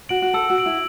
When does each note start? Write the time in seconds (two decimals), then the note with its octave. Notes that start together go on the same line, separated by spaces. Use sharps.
0.09 F#4 D7 F#7
0.22 F#4
0.34 A4 E6
0.50 F#4
0.58 D7 F#7
0.66 E4